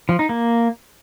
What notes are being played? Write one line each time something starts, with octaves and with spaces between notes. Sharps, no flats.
F3
D#4
A#3